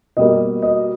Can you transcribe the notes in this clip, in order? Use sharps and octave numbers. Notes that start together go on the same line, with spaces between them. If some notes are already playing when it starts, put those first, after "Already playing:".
B2 G3 A#3 D#5
D#5